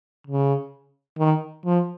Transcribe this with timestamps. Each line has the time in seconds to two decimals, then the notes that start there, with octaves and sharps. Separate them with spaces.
0.27 C#3
1.19 D#3
1.65 F3